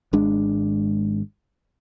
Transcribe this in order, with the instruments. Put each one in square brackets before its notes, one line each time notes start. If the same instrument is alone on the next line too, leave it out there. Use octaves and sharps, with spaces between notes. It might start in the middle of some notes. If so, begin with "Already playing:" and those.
[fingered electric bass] G#1 G#3 D4